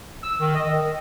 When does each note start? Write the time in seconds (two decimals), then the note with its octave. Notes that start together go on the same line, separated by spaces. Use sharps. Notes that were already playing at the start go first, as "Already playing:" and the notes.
0.23 E6
0.40 D#3
0.55 D#5
0.72 D#3